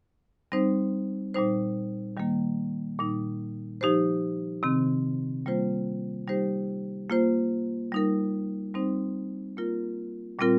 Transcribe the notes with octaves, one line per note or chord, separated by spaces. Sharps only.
G3 C4 D#4 C5
A#2 G3 D#4 C5
D#3 G3 A#3
A#2 G3 D#4
F3 D#4 G4 C5
C3 D#3 C4
G3 A#3 F4 C5
G3 D#4 G4 C5
A#3 F4 C5
G3 D#4 A#4
G3 C4 D#4 C5
A#3 F4 A#4
A#2 G3 C4 F4 A#4